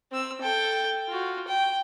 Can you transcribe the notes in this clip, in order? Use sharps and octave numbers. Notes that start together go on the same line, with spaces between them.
C4 E6
A4 G5
F4 F#4
G5